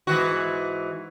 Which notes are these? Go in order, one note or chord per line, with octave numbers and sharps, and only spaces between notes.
G#2 E3 F#4